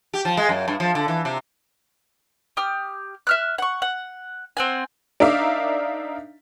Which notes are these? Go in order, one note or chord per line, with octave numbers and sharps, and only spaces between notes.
G4
F3
G#3
F#2
G2
F3
D3
E3
C3
G4 D#6 F6
E5 F6 F#6
F#5 C#6
F#5
C4 F#5 G#5
D4 D#4 A#4 E5 F5 D6